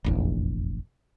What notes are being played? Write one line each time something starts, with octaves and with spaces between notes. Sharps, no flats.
F1 A#1 E2